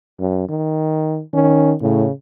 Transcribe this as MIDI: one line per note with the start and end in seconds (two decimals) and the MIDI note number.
0.19 0.46 42
0.49 1.21 51
1.34 1.75 51
1.34 1.74 61
1.81 2.06 45
1.81 2.12 49